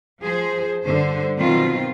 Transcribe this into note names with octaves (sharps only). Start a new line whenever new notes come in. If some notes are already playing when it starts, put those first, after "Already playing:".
F3 G#4 C5
G2 D3 C5
B2 D#3 F3 F#3 C4 F4